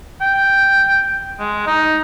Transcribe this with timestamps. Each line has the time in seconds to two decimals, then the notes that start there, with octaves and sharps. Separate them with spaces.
0.21 G5
1.39 G#3
1.67 D#4